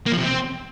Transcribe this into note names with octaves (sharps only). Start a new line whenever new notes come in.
A#3
F3
C3
C4